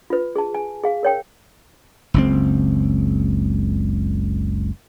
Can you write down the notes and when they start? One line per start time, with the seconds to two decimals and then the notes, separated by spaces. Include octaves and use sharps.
0.10 F4 B4
0.36 G#4 A5
0.54 G#5
0.83 G#4 F5
1.03 A#4 C#5 G5
2.14 F#1 C#2 C4